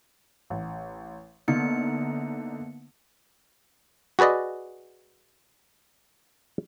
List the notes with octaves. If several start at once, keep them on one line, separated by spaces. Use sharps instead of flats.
A1
D3 A#3 B3 D#4 C#7
F#4 G#4 B4 D5 D#5